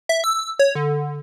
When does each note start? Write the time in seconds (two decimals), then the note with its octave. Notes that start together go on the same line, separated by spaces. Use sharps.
0.09 E5
0.24 E6
0.59 C#5
0.75 D3